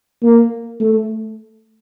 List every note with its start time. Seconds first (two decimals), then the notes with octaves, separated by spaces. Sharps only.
0.23 A#3
0.80 A3